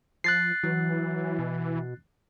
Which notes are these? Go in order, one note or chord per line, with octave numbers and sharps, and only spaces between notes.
F3 F#6 A6 C7
E3 F#3
B2